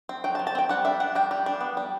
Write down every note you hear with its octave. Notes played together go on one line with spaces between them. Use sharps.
C4
F#3 G5
A5
F#3
A5
C4 G5
G3 F#5
D4 E5
D4 F#5
G3 G5
G3
D4
B3
G3